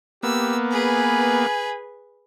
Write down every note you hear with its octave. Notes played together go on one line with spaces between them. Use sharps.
A#3 B3 G4 E6
G#4 B4 G#5